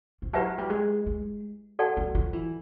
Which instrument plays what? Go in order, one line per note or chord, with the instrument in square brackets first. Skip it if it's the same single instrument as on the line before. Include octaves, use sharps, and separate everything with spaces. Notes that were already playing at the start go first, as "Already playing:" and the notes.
[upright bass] F3
[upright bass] F#3 [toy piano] E4 G4 B4 E5 A5
[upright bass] G3
G#3
G#3
[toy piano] F#4 A4 D5 F#5 A5
[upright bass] F#3
F3
E3